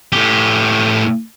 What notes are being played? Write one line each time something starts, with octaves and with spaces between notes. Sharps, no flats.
A2 G4